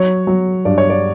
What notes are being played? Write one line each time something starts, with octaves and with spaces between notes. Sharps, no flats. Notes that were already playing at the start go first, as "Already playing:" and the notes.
Already playing: F#3 C#5
F#3
G2 D5
C#5
D5